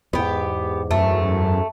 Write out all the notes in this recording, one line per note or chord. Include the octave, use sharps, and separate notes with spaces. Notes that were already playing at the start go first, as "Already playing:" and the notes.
E2 G#2 B3 G4
F#2 A3